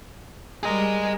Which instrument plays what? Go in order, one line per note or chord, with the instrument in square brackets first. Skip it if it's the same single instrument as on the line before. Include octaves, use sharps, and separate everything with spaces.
[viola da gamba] G3 A#4 [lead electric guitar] G#4 D#5